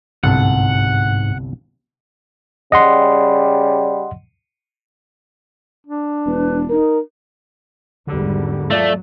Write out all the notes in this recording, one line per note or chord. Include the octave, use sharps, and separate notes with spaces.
G1 C2 G#2 A4 F#5
C#3 G3 D#5 F#5 C6
D4
E1 B4
D#4 A#4
G#1 E2 D3 G3
F#3 A3 F4 D5